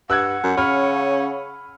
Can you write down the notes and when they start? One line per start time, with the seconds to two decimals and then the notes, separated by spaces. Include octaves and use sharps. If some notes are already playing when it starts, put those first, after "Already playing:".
0.10 G2 F#5 E6 F#6 G#6
0.44 F#2
0.57 C#3 C#4 B5 F6